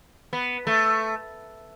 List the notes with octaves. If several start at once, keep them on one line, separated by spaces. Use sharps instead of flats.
B3
A3